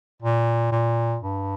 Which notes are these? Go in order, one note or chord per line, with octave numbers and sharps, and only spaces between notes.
A#2
A#2
G2